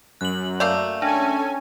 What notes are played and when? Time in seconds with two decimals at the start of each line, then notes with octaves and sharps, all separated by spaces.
0.21 F#2 F#6 F#7
0.60 A3 A#3 D5 F5
1.02 C#4 D4 A4 G#5